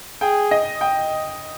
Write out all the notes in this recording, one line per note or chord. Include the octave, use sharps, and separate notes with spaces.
G#4 G5
D#5
G5